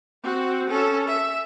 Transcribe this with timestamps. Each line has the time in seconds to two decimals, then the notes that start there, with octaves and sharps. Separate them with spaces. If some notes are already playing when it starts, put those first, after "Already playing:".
0.24 C4 F#4
0.70 C#4 A4
1.08 E5